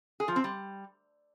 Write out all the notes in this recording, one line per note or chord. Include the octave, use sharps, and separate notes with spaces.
G#4
F3
C4
G3